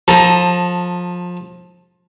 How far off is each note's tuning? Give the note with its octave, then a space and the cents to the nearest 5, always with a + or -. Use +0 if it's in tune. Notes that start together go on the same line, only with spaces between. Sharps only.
F3 +25 A4 +0 A#5 +20